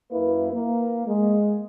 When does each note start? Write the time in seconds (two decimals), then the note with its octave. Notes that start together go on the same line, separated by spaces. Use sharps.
0.12 F#2 A#3 E4 B4
0.52 A#3
1.08 G#3